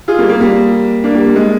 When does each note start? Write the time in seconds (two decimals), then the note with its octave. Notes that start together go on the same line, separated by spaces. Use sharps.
0.08 F4 G#4
0.19 G3 A#3
0.29 G3 A#3
0.40 G3 A#3
1.04 A#3 D4
1.14 G3 A#3
1.26 G3
1.36 G#3